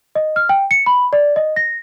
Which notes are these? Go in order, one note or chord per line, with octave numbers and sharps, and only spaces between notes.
D#5
F6
G5
C#7
B5
D5
D#5
A#6